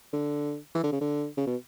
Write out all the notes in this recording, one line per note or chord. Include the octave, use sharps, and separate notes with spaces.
D3
E3
D3
C#3
D3
C#3
B2